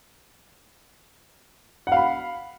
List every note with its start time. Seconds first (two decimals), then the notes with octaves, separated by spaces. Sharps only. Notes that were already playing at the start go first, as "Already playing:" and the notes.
1.87 F#5
1.92 F5
1.97 B5